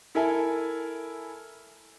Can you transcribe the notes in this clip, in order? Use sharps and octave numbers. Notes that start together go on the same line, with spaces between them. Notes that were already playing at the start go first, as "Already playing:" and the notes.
E4 A4 A#4 E5 G#5